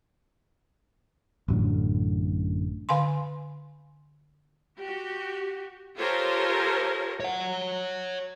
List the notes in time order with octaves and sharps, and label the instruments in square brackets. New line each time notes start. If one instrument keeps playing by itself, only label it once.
[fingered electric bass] A1 F#2 A2 D3
[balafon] D3 F5 G#5 C6
[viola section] F#4 G4
F4 G4 A4 A#4 C5 C#5
[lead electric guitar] C#5 F#5